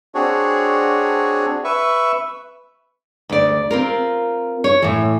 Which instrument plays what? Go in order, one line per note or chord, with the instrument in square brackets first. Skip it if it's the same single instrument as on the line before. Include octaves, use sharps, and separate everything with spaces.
[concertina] C4 D4 F#4 G#4 C#5
B4 E5 C#6
[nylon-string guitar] D2 D5
C4 F4 A#4
C#5
A2 E3